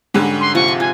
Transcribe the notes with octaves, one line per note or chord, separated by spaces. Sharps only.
G#2 D3 G3 C#4 D#4
C6
C3 F3 F4 C#6
C6
F4 G#5